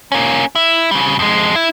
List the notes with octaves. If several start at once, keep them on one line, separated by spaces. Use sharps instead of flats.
A#3 C#4
E4
C#3 G3
F2 G#3
E4